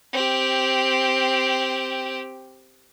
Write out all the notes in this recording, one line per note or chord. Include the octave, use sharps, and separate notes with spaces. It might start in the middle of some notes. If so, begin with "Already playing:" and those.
C4 G4